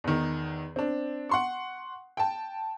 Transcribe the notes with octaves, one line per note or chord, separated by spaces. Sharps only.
E2 D#3
C4 D4
F#5 C6 C#6
G5 A5